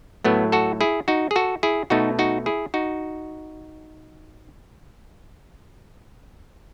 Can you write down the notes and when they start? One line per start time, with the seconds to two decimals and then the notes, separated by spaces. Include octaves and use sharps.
0.25 A2 F#3 A3 B3
0.52 F#4 A4
0.81 E4 G#4
1.08 D#4 F#4
1.31 G#4
1.36 F#4 A4
1.63 E4 G#4
1.90 B2 A3 D#4 F#4
2.19 D#4 F#4
2.46 E4 G#4
2.74 D#4 F#4